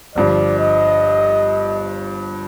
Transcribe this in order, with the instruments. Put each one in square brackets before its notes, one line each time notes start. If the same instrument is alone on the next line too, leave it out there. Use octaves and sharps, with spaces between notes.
[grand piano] G1 G2 F3 [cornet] D5
[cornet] D#5